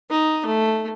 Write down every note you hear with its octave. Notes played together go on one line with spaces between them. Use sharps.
D#4
A3